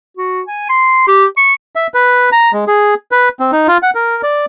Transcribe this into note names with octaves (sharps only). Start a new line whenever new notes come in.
F#4
G#5
C6
G4
C#6
E5
B4
A#5
G#3
G#4
B4
C4
D#4
F4
F#5
A#4
D5